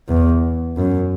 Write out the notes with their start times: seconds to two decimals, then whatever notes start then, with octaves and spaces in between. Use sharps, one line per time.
0.08 E2
0.77 F#2